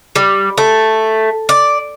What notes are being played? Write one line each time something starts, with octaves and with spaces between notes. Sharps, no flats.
G3
A3
D5